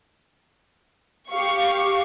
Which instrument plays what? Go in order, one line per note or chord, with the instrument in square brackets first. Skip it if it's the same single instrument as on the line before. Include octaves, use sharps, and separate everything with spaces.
[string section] G4 F5 C#6